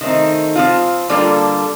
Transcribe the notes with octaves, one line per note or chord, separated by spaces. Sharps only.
D#3 A3 C4 D#4
F3 C4 F4
D3 G3 A#3 F4 A4